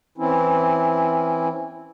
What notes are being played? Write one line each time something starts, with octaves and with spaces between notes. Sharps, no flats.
E3 C4 C#4 E4